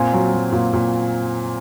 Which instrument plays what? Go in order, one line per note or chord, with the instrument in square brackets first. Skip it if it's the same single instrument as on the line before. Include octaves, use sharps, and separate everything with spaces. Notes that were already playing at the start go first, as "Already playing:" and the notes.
Already playing: [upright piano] A#2 C4 G#5
F#3
F#3
A#2
A#2